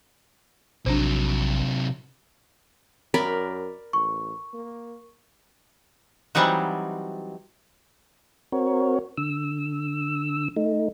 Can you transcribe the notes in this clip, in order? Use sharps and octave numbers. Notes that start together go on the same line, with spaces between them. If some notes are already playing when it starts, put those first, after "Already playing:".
A#1 C3 F#3 D4 C5
F#2 A#4 D5 B5
A1 C#6
A#3
E3 F#3 G3 C4 D#4 F#4
C4 F#4 A#4 C#5
D3 E6
A3 D#4